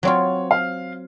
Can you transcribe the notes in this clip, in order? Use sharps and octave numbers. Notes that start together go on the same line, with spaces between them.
F#3 C4 F4 C#5
F5